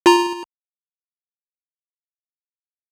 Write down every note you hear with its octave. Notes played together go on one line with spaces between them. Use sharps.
F4 A#5